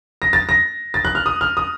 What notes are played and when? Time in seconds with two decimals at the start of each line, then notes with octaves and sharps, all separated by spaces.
0.22 A#6
0.33 A6
0.49 A#6
0.94 A6
1.05 F#6
1.15 F6
1.26 D#6
1.41 F6
1.57 D#6